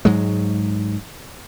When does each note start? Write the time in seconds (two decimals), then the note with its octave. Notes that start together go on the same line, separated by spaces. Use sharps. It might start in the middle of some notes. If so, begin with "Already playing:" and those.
0.05 G#2 F#3 G#3